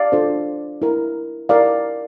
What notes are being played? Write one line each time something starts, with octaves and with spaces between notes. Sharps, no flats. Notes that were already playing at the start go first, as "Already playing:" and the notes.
Already playing: D5 F5
D4 F4 A4 C5
E4 A#4
E4 A#4 D5 F5